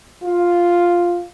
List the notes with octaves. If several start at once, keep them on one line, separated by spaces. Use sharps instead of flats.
F4